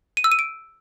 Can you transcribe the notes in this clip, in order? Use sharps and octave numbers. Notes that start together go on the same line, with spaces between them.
D#7
E6
D#7
D7